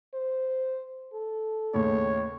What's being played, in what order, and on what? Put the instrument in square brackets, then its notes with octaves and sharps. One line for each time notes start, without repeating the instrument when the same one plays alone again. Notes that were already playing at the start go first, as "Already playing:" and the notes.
[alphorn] C5
A4
[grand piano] D#2 A2 C#3 [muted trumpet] C#5